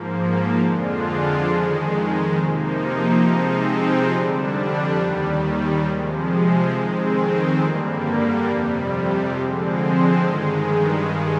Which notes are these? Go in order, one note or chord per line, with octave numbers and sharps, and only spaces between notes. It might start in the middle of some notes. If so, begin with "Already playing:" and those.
Already playing: G#2 F3 A#3
F2 D3 G#3 D4 F4
F2 D#3 G#3
C3 F3 A#3 D#4
C3 F3 G#3 C4 D#4
F2 D3 G3 D4
D#2 D#3 G3
C3 F3 G#3
F2 D#3 G#3 C4
G2 D3 G3 A#3
F2 C3 G3
D3 F3 G#3 C4
G2 D#3 G#3